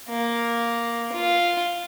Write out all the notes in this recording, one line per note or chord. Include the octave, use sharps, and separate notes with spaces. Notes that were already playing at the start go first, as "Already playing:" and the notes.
A#3
F4